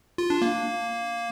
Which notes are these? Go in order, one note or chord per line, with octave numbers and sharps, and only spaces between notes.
F4
D4
A#3